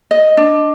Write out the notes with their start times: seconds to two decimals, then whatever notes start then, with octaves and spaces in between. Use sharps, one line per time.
0.11 D#5
0.37 D4